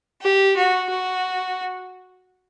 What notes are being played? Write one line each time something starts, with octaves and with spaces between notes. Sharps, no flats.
G4
F#4
F#4